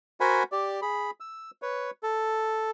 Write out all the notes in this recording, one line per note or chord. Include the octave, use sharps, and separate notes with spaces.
F#4 A#4 C5 F#5 G#5 B5
G4 D5
G#4 B5
E6
B4 C#5
A4